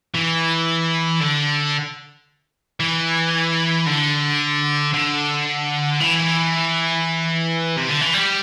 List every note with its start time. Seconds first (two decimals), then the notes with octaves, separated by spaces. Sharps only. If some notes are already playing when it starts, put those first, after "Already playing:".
0.15 E3
1.20 D3
2.80 E3
3.86 D3
4.94 D3
6.01 E3
7.77 C3
7.89 D3
8.01 E3
8.14 G3